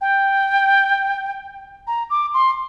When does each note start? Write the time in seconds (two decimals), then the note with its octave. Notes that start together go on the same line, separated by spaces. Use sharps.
0.01 G5
1.87 A#5
2.10 D6
2.34 C6